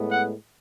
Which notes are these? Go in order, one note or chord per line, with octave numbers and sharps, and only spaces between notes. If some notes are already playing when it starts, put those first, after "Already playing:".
Already playing: A2 G#3 B3
F#5